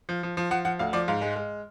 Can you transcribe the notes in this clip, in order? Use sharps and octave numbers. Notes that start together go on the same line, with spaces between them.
F3
F3
F3
F3 F#5
F3 F#5
D2 F5
F3 D5
G#2 F5
G#3
G#3